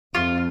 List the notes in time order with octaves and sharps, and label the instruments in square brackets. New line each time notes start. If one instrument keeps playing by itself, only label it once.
[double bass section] F2 [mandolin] F4